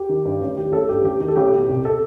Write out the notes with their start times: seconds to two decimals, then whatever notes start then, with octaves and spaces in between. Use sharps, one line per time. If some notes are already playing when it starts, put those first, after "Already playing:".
Already playing: G4
0.09 D#3
0.25 G2
0.41 A1
0.57 D#3 G4
0.72 A1 A4
0.88 G2 G4
1.04 A1 G4
1.20 D#3 G4
1.28 A4
1.36 A1 G4
1.52 B2
1.69 C2
1.85 A4